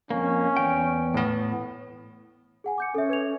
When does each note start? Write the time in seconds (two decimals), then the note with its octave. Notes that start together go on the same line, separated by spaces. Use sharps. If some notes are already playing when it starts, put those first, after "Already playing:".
0.10 F2 A#3 C#4
0.57 E2 G5
1.14 A2 B3
2.64 G#4 F#5 G#5
2.78 D6 G6 C#7
2.95 C#4 A4 E5
3.09 B4 G#6 F7